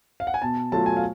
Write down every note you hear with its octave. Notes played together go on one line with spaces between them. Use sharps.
F5
F#5
G#5
B2 A5
F#3 A3 F4 A5
G#5
F5